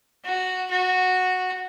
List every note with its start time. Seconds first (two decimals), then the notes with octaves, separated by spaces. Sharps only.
0.25 F#4
0.70 F#4